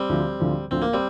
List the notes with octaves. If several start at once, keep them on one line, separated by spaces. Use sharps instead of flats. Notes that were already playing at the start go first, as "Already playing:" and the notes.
Already playing: G3 C4
D2 D3 F3
D2 D3 F3
D2 D3 F3 C4
A#3
G3 C4